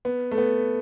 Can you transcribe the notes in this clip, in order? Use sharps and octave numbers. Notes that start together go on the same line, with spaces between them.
B3
A3
B3